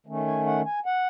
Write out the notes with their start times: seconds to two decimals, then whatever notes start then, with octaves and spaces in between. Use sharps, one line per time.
0.06 D#3 A3 C#4
0.27 G#5
0.46 F#5
0.65 G#5
0.86 F#5